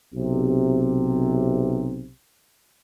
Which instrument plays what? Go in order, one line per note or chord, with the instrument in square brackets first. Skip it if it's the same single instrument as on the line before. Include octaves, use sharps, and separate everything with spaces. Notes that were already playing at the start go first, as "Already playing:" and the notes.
[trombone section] B1 C3